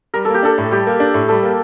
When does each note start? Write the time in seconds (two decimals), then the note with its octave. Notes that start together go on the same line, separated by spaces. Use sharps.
0.14 G3 A#4
0.25 A#3 A4
0.34 G4
0.43 D4 A4
0.58 A2
0.71 G3 G4
0.86 A#3
1.00 D4
1.14 A2
1.28 G3 A4
1.43 A#3